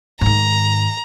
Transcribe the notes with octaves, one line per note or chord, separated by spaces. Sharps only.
G#2 D#3 A#5